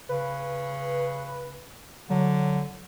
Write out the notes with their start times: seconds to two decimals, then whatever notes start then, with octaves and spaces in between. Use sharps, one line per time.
0.09 C#3 B4
2.10 D3 F#3